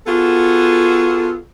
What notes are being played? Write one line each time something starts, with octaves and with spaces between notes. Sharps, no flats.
B3 F4 F#4 G#4 A4